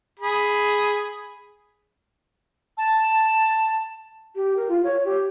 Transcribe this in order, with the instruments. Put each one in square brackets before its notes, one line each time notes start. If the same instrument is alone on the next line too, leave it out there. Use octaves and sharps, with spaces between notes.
[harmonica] G#4 B5
[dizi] A5
[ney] G4
A#4
F4
C#5
G4